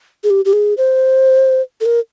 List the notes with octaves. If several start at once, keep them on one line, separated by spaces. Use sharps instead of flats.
G#4
G4
G4
G#4
C5
A4
A#4